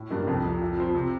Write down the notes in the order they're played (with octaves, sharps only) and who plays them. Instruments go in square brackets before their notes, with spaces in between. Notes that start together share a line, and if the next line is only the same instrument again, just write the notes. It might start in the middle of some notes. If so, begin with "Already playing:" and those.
Already playing: [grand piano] A2
[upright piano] G2 [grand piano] G3 A#3 D4
[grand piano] C2 [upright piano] F2
[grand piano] C3 F3
A#2
F3 C4
C3